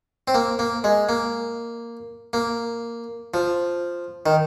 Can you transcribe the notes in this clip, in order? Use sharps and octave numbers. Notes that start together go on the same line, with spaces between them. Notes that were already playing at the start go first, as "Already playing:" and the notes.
C4
A#3
A#3
G#3
A#3
A#3
F3
D#3